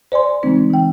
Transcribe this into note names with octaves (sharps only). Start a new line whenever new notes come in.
C5 D5 G#5 C6
C#3 E3 G#3 A3 C4 D#4
E3 G5